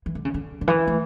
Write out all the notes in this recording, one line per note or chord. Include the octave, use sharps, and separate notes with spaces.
E3
D3
C#3
D3
D3
E3
A3